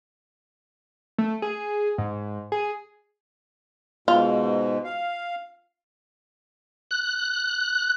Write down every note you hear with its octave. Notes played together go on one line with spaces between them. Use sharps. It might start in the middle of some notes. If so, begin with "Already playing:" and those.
A3
G#4
G#2
G#4
G#2 B2 F4
F5
F#6